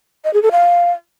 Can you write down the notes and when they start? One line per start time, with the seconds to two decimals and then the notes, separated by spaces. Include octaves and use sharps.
0.24 D#5
0.33 G#4
0.42 A4
0.51 F5